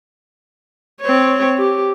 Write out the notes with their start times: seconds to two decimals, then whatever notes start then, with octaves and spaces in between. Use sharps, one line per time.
1.01 C4 C#5
1.58 G4